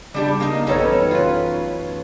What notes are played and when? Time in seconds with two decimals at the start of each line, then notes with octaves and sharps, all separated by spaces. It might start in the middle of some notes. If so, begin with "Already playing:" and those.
0.14 C#3 G3 D4 G4
0.40 A#3 D#4
0.67 A1 F#2 G3 B3 C#4 D#4 A4 C#5
1.11 F4 B4